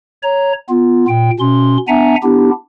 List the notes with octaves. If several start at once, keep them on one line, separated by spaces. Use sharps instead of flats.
C#5 A#5
B3 F4
A#2 G5
B2 C#4 C6
B3 D4 E5 F#5 G#5 A#5
B3 D4 E4 G4